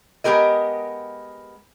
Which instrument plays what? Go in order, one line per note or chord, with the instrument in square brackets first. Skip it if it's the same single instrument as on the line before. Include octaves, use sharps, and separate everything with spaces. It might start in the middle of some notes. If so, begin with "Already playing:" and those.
[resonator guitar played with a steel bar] G#3 B3 C4 G4 A#4 D#5